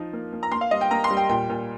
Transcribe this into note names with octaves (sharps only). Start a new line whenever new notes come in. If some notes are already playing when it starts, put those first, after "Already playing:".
Already playing: F3 D#4
A#3
A#3
A#5
A#3 C6
F5
G3 D#5
G5
A#3 A#5
C6
G3
G5
A#2 G5
A#2